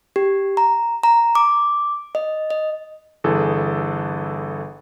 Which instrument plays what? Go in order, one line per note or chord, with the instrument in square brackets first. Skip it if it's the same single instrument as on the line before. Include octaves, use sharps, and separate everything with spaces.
[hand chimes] G4
A#5
A#5
D6
D#5
D#5
[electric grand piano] G1 E3 G#4 A4